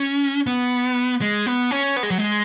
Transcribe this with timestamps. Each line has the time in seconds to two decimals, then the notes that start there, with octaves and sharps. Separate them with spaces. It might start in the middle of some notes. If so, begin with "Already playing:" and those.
Already playing: C#4
0.47 B3
1.21 G#3
1.46 B3
1.71 C#4
1.96 B3
2.03 G#3
2.11 F#3
2.18 G#3